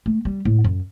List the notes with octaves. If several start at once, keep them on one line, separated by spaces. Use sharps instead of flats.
A3
G3
A2
F#2